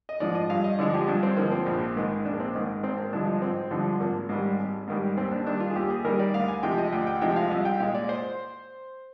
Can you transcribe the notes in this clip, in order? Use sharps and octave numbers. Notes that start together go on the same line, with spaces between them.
D#5
G#2 F3 G#3 D5
D#5
G2 F5
D#5
D3 F3 G#3 D5
G4
G2 D4
C4
D3 F3 G#3 A#3
C4
A#1
G#2 D#3 G#3
A#1 D4
A#3
C4
G#2 D#3 G#3
G#1 C4
A#3
G2 D3 F3 G#3 D4
D#4
G#1 C4
G2 D3 F3 G#3
G#1 A#3
G#2 D#3 G3
G#1
G#2 D#3 G3
D#2 C4
D4
D#3 G3 D4
F4
G#4
D#2 G4
G#4
D#3 G3 A#4
D5
D2 F5
G#5
C3 F3 G#3 G5
D#5
D2 G5
G5
C3 F3 G#3 G5
F5
C2 D#5
G5
A#2 G#3 F5
D5
C5